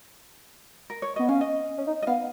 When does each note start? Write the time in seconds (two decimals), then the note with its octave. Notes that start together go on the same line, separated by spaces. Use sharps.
0.90 A#4
1.02 C#5
1.16 B3 D#5
1.29 C#4 F5
1.41 D#5
1.78 C#4
1.87 D#4
2.02 D#5
2.07 B3 F5